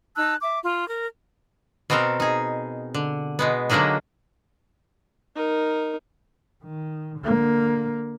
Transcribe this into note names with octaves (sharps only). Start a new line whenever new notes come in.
D#4 A5 E6 F#6
E5 D6
F4
A#4
B2 B3 C4 A4 A#4
D#4 G#4
D3
B2 G#3 B3
D3 F#3 G#3 A#3 D4 D#4
D#4 A#4
D#3
D3 A#3